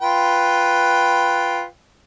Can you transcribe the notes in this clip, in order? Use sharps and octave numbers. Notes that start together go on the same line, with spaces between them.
F4 B4 G5